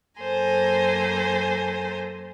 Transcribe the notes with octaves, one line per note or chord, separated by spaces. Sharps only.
F#2 A#3 A4 C5 G#5 A#5